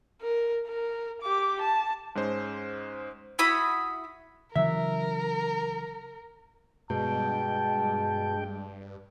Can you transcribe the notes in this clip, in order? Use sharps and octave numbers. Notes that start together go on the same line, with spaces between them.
A#4
A#4
G4 D6
A5
G#2 G#3 C#4 C5
E4 F#4 B5 D#6
C#3 E3 F#3 A#4 E5
G2 B2 G#3 G5 A5